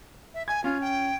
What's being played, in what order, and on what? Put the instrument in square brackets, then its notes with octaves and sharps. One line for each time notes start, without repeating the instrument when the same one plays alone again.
[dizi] E5
[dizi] G#5 [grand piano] G#6
[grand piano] C#4 [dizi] F4
[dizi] G5